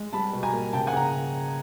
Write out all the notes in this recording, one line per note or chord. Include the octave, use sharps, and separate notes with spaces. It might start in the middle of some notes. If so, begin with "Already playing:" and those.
Already playing: G#3
G3 A5 B5
B2
G#5 A#5
A#3
C#3 G5 A5
F#5 G#5
C#3 A#5